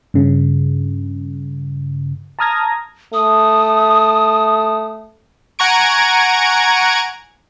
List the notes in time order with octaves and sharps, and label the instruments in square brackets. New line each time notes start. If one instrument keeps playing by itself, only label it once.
[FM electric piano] G2 C#3
A5 A#5 D#6 F6 G#6 A#6
[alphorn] A3 [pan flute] D#6
[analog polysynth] F#5 G#5 A#5 C#6 G#6 D7